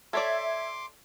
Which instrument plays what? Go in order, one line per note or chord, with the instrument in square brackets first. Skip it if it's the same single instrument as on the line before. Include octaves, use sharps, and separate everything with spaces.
[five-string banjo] A4 C#5 D5 [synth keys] E5 G#6 [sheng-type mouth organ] C6 D6